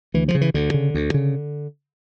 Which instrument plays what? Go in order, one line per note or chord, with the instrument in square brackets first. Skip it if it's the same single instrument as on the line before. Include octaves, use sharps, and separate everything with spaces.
[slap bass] D2 E3
F3
C#3
E3
D2 D3
C#3
D2
C#3